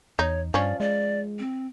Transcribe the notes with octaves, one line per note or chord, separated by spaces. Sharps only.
E2 D#4 C#5
G2 F3 C#4 D5
G#3 D5
C4